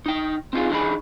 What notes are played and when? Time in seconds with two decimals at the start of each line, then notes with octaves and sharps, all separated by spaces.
0.06 D#4 G5
0.53 C4 D#4 F4 G#4
0.70 D3 E3 D#4 G#4 B5